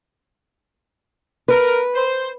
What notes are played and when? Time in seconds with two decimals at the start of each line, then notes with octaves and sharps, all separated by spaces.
1.48 A#4 B4
1.94 C5